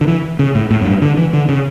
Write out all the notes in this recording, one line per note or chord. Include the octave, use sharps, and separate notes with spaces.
D3
E3
C#3
A2
A2
F#2
G2
D3
E3
D3
C#3